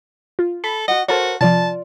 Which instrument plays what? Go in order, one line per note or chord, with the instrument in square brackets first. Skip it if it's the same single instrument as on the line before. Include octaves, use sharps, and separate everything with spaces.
[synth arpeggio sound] F4
[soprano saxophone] A4 [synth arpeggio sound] B5
[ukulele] F#4 F#5 [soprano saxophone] D#5
[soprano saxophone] F#4 [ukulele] A4 A#4 C5 [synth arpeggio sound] C#5 A5
[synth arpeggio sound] C3 F3 [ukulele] F4 D5 [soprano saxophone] A5